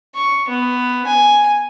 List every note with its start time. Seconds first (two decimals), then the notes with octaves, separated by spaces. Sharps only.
0.15 C#6
0.49 B3
1.07 G#5